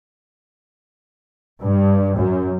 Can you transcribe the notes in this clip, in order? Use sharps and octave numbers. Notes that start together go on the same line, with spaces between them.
G2
F#2